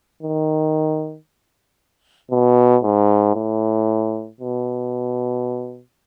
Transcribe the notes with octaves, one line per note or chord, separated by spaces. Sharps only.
D#3
B2
G#2
A2
B2